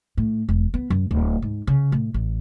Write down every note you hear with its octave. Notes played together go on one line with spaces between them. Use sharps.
A2
E1
B3
F#2
D1
G#2
C#3
A2
A1